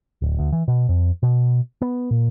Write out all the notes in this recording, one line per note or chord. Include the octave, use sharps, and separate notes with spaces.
D1
D2
E3
B2
F2
B2
B3
A#2